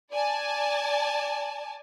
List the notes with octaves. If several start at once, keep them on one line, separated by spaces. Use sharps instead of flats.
D5 G#5 A5